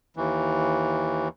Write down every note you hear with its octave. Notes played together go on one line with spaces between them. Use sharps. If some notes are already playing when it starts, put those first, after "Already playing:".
D#2 E3